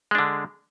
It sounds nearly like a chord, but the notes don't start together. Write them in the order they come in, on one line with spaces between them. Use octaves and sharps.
G#3 D4 D3